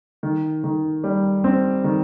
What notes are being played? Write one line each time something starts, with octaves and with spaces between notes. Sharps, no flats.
D#3
D#3
G3
C4
D#3